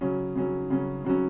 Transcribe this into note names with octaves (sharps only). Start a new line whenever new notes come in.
C#3 F#3 C#4
C#3 F#3 C#4
C#3 F#3 C#4
C#3 F#3 C#4